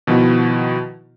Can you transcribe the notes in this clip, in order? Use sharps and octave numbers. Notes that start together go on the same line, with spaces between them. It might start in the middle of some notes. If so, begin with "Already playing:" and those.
B2 D#3 F3 B3 E4 F#4